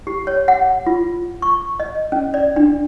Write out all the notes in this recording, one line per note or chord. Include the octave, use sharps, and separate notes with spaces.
G4
C#5
F#5
F4
C#6
D#5
C#4
D5
D4